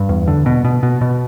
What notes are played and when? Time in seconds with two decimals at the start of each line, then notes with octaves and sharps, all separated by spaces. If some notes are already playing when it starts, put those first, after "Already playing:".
Already playing: G2
0.09 E2
0.28 D3
0.46 B2
0.65 B2
0.83 B2
1.01 B2